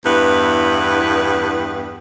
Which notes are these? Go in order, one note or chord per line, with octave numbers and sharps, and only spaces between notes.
E2 G2 B3 E4 B4